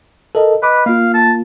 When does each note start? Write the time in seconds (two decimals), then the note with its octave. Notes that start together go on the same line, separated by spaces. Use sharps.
0.35 A4 A#4 D#5
0.63 B4 D#5 B5 D6
0.86 A#3 F4 F5
1.14 A5